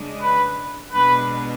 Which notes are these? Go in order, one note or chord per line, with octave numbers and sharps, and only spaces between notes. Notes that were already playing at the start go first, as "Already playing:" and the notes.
Already playing: C#3 G#3 D4
B4
B2 G#3 D4 B4